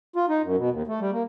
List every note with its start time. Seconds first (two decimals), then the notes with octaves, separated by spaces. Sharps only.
0.16 F4
0.29 D#4
0.42 F#2
0.57 B2
0.70 D#2
0.87 A3
1.00 G3
1.12 A#3